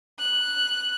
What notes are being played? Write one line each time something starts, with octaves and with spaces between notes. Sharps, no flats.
F#6